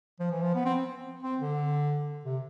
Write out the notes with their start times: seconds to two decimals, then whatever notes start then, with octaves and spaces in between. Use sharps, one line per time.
0.20 F3
0.31 E3
0.42 F3
0.55 B3
0.65 C4
1.23 C4
1.40 D3
2.25 C3